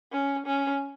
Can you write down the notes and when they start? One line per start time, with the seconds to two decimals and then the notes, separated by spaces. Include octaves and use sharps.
0.12 C#4
0.46 C#4